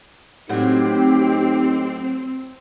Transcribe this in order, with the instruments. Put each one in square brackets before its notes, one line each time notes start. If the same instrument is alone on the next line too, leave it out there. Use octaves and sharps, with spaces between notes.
[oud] A2 F#3 F#4 [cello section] C4 [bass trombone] D#4 [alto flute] G4